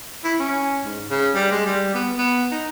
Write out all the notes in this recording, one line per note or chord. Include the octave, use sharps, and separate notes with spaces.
E4
C#4
G#2
C#3
G3
G#3
G3
B3
B3
D#4